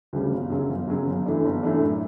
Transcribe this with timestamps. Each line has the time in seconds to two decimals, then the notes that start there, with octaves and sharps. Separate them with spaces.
0.13 D2 C#3 G3 C#4
0.31 G1
0.50 F#2 C#3 F#3 C#4
0.70 G1
0.87 F#2 C#3 F#3 C#4
1.06 G1
1.26 F#2 E3 A3 D4
1.45 G1
1.63 F#2 E3 A3 D4
1.81 A2